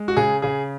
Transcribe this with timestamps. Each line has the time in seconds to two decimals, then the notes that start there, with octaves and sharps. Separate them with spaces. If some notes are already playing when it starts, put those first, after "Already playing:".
Already playing: G#3
0.08 F#4
0.17 C#3 G#4
0.42 C#3 G#4